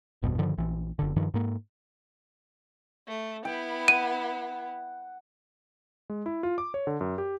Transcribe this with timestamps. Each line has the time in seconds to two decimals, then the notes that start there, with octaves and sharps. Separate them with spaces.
0.22 G#1 E2 G2 B2
0.38 G2 D3 D#3 F3
0.58 A#1 E3
0.99 F#1 D3
1.16 G2 D#3 F3
1.34 G#2 A#3
3.08 A3
3.45 B3 E4 G5
3.88 F#5 D#7
6.10 G#3
6.26 E4
6.43 F4
6.58 D6
6.74 C#5
6.87 D3
7.01 F#2
7.18 G4